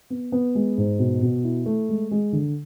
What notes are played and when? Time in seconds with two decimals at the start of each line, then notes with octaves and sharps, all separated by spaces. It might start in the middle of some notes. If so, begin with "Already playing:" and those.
0.10 B3
0.32 B3
0.55 G#3
0.78 G#2
0.99 B2
1.22 B2
1.44 E4
1.66 A3
1.89 G#3
2.11 G#3
2.33 D3